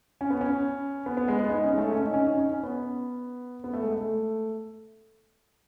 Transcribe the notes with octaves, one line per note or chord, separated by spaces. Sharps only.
C#4
B3
C#4
B3
B3
G#3
B3
D#4
C#4
G#3
A3
C#4
D#4
C#4
D#4
C#4
C#4
B3
B3
A3
G#3
A3